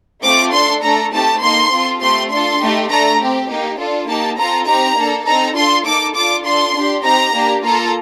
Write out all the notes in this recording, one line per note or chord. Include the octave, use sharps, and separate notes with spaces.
A3 C4 F4 A4 D6
D4 A4 C6
A3 D4 A4 A#5
A3 C4 D#4 G4 A5
A#3 D#4 A4 C6
C4 F4 A4
A3 C4 G4 C6
D4 F4 A4 C6
A3 D#4 G4
A3 D4 A4 A#5
C4 G4
A#3 D#4 G4
D4 F4 A4
A#3 D#4 G4 A5
C4 F4 A4 A#5
C4 D#4 G4 A#5
A#3 D4 A4
C4 D#4 A4 A#5
D4 F4 A4 C6
A#3 D#4 A4 D6
D4 F4 A4 D6
D4 F4 A4 C6
D4 G4
C4 D#4 G4 A#5
A#3 D4 G4
A#3 F4 A4 A#5